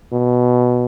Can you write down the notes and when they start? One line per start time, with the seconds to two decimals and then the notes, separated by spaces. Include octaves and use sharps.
0.12 B2